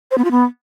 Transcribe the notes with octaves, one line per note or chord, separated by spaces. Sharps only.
C5
B3
F4
B3